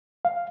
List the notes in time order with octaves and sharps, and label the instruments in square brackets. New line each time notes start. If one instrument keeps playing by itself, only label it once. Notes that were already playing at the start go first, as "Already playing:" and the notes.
[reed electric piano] F5